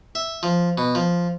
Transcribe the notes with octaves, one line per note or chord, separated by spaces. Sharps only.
E5
F3
B2
F3